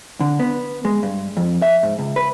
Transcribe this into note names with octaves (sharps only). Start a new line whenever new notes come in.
D3
B3
G#3
G2
F2
E5
G#2
C#2
B4